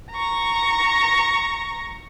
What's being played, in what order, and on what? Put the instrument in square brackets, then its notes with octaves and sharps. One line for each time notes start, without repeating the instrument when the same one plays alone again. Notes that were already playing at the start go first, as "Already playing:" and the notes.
[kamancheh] A#5 C#6